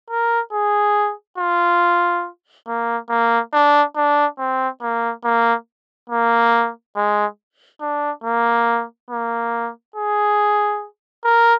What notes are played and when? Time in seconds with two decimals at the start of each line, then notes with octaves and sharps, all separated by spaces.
0.10 A#4
0.53 G#4
1.38 F4
2.68 A#3
3.10 A#3
3.53 D4
3.96 D4
4.39 C4
4.82 A#3
5.24 A#3
6.10 A#3
6.96 G#3
7.81 D4
8.24 A#3
9.10 A#3
9.96 G#4
11.25 A#4